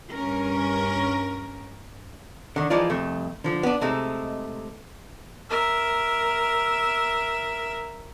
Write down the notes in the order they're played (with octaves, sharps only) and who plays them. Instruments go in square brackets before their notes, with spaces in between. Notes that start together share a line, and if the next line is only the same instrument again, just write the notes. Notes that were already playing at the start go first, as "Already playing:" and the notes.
[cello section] G2 C#4 A#4
[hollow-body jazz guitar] D3 D#3
E3 F3 G#3 D#4 F4 D5
C2 F2 A3
D3 F3
B3 D4
C3 G#3 A3 D#4
[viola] A#4 E5